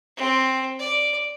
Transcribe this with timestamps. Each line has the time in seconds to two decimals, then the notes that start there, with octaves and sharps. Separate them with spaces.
0.17 C4
0.79 D5